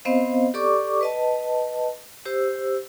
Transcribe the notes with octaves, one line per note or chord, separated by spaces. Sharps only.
B3 C4 C5 D#5 F5
G4 A4 D5 C#6 D6
B4 D#5 A5
G4 C5 E6